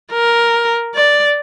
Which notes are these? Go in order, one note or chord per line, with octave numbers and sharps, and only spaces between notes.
A#4
D5